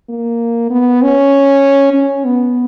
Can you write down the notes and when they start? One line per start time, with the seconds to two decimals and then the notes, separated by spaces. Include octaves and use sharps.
0.09 A#3
0.70 B3
1.02 C#4
1.94 C#4
2.25 B3